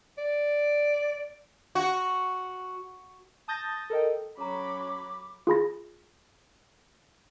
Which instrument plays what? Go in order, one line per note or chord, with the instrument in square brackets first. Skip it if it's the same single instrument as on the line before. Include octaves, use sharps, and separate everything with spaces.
[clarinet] D5
[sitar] F#4
[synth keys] A5 D#6 G6 A6 A#6
A4 A#4 D#5 G5
[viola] F#3 B5 [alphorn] C#4 [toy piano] A4 A#5 [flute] D6
[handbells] F4 G#4 B5 A#6